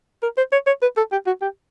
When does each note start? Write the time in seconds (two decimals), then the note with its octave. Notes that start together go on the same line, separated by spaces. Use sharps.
0.23 A#4
0.37 C5
0.52 C#5
0.67 C#5
0.82 B4
0.97 A4
1.12 G4
1.27 F#4
1.42 G4